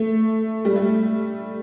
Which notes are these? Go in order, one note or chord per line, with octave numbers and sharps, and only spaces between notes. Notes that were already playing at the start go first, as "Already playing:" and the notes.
Already playing: A3
G3
A3